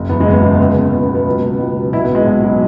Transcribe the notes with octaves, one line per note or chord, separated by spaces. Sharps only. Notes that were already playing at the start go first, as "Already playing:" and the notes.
Already playing: F#1
E2 B3
G#3
F#1 B3
B2
C#2
B2
C#2 B3
B3
F#3
B3
C#2
B2
C#2
F#3
B1 E4
B3
B2
G#3
B1
F#3